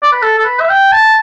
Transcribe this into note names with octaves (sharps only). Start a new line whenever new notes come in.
D5
B4
A4
A4
B4
E5
G5
A5